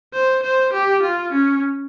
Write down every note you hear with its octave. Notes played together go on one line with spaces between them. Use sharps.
C5
C5
G4
F4
C#4